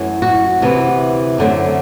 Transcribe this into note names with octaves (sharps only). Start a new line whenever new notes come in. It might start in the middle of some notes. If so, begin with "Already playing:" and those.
Already playing: F#2 E3 A3
F#4
D2 C3 E3 B3
F#2 D3 A3 C4